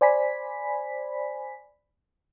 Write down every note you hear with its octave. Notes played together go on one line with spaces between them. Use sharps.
C5 D5 G#5 B5 B6